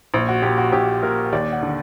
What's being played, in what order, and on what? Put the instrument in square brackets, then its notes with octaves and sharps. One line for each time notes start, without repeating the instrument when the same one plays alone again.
[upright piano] A#1
F#4
A#2 G4
F#4
A#1 G4
A#2 A#4
D#2 D5
F#5
D3